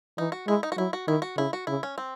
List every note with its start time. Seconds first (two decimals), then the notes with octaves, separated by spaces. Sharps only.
0.18 E3 D#4
0.32 F#4
0.47 G#3 E4
0.63 D#4
0.72 F#4
0.77 F#3 E4
0.93 F#4
1.08 D#3 E4
1.22 F#4
1.37 C#3 E4
1.53 F#4
1.67 C#3 E4
1.83 C#4
1.98 C4